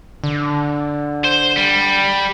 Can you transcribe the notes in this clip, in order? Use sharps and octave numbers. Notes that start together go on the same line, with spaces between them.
D3
C5
G3